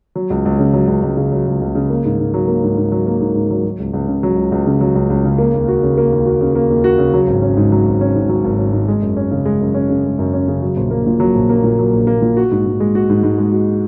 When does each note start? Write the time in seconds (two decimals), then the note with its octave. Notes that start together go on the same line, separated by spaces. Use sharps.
0.15 F#3
0.30 C#2
0.45 C#2
0.59 C#3
0.73 F#3
0.88 C#2
1.03 C#2
1.17 C#3
1.32 F#3
1.47 C#2
1.61 C#2
1.75 C#3
1.90 A#3
2.05 G#2
2.19 G#2
2.34 F#3
2.48 A#3
2.63 G#2
2.77 G#2
2.92 F#3
3.07 A#3
3.21 G#2
3.35 G#2
3.50 F#3
3.65 F#3
3.80 C#2
3.93 C#2
4.08 C#3
4.23 F#3
4.37 C#2
4.52 C#2
4.66 C#3
4.81 F#3
4.95 C#2
5.10 C#2
5.25 C#3
5.38 A#3
5.54 D#2
5.68 F#4
5.83 C#3
5.98 A#3
6.12 D#2
6.26 F#4
6.41 C#3
6.55 A#3
6.70 D#2
6.84 F#4
6.98 C#3
7.13 F#3
7.27 G#1
7.42 C#4
7.57 G#2
7.72 F#3
7.86 G#1
8.01 C#4
8.15 G#2
8.29 F#3
8.44 G#1
8.58 C#4
8.73 G#2
8.88 G#3
9.02 F#2
9.17 C#4
9.31 C#3
9.45 G#3
9.61 F#2
9.74 C#4
9.89 C#3
10.05 G#3
10.19 F#2
10.33 C#4
10.48 C#3
10.62 F#3
10.77 A#1
10.91 A#3
11.06 A#2
11.20 F#3
11.35 A#1
11.49 A#3
11.64 A#2
11.79 F#3
11.93 A#1
12.07 A#3
12.22 A#2
12.37 F#4
12.51 G#2
12.66 G#2
12.80 G#3
12.95 F#4
13.10 G#2
13.23 G#2
13.38 G#3
13.52 F#4